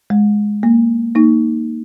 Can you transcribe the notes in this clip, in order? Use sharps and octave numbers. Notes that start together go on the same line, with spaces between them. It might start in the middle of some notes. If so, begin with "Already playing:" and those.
G#3
A#3
A#3 D#4